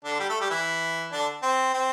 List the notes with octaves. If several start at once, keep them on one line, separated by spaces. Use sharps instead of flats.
D3 D4
G3 G4
A3 A4
G3 G4
E3 E4
D3 D4
C4
C4